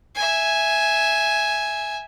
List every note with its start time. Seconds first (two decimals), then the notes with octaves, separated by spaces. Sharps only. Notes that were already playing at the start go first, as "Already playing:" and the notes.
0.15 E5 G#5